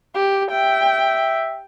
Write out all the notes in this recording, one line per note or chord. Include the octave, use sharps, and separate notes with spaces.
G4
E5 G5